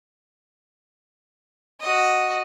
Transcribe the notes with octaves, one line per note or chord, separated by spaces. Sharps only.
F#4 D#5